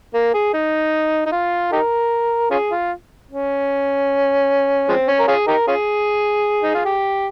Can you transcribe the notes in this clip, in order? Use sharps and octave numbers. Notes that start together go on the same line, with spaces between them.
A#3
G#4
D#4
D#4
F4
D#4 G4 A#4
C#4 F4 G#4
F4
C#4
F3 G#3 C4
C#4
A#4
C#4 F4 G#4
D#4 G4 A#4
C#4 F4 G#4
D#4
F4
G4